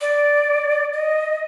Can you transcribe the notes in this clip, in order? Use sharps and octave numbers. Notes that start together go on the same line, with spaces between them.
D5
D#5